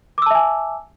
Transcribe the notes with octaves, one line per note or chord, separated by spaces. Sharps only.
E5 G#5 A5 D6 E6